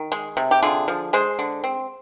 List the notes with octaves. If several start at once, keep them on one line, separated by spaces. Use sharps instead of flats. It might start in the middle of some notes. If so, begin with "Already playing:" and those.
Already playing: D#3
G#3
C3
G4
D3 F4 G#4
F3
G#3 G#4 C5
D3
C4